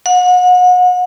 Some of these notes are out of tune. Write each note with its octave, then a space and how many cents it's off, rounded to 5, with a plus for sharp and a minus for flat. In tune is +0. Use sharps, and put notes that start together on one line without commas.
F#5 -35